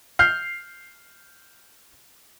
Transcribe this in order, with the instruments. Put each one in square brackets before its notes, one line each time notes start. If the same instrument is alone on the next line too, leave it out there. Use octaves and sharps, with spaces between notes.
[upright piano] F6 G6 C7